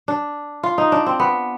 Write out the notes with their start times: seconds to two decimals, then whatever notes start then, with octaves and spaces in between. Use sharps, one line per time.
0.08 D4
0.63 F4
0.78 D#4
0.92 D4
1.06 C4
1.20 B3